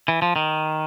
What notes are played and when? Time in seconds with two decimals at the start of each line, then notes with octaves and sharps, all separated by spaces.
0.08 E3
0.22 F3
0.36 D#3